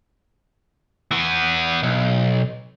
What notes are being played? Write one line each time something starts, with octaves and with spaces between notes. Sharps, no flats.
E3 B3
B1